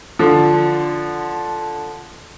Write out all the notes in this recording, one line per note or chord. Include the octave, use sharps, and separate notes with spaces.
D3 F3